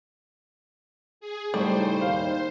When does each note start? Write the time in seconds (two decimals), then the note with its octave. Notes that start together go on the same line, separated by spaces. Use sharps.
1.21 G#4
1.54 A2 C#3 G3 A3 D#4 C5 C#6
2.01 D#2 F5